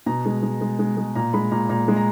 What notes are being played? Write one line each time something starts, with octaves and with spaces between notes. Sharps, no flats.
B2 A#5
G#3
G#3
G#3
G#3
G#3
A#2 A#5
G#3 B5
A#2 A#5
A#2 A#5
G#3
A#5